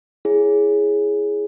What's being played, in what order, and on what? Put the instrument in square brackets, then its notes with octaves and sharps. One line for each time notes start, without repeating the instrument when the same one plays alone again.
[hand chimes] E4 G#4 C#5